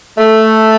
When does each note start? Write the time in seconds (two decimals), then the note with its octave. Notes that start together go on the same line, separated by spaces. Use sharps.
0.18 A3